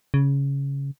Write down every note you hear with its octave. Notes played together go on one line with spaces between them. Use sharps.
C#3